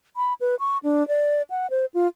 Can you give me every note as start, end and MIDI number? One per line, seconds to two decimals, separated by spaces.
0.17 0.34 83
0.41 0.55 71
0.60 0.78 85
0.83 1.06 62
1.08 1.42 74
1.50 1.70 78
1.70 1.86 72
1.94 2.07 65